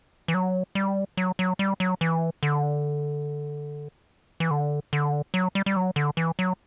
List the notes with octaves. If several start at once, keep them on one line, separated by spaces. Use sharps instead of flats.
E3
F#3
G3
F#3
F#3
G3
F#3
E3
D3
E3
D3
D3
F#3
G3
G3
F#3
D3
E3
F#3